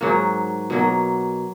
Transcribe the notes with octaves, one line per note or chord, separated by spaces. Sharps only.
G#2 F#3 A#3 F#4
B2 F#3 A#3